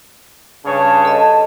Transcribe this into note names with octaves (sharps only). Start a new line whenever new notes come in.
G2 C#3 C#5 A5
A4 D#5